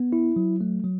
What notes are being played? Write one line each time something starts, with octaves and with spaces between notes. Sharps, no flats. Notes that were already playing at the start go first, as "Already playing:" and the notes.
Already playing: B3
E4
F#3
A3
F#3